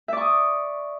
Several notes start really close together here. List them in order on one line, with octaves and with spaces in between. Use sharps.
E5 D5 C#6 D#6